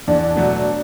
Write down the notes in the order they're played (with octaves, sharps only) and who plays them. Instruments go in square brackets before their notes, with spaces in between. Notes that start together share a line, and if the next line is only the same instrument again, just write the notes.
[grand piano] E2 [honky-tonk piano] D4
[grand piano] B2 F#3 A3 F#4